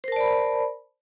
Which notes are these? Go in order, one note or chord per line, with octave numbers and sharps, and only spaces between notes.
A#4 C5 D5 A5 B5